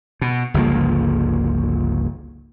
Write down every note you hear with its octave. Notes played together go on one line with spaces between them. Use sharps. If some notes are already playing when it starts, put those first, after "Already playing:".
B2
G1 C#2 F3 A#3